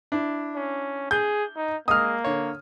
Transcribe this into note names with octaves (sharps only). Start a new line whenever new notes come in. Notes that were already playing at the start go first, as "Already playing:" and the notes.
D4 E4
C#4
G#4 G6
D#4
G#3 A#3 D#5 D#6 F6
D3 C#5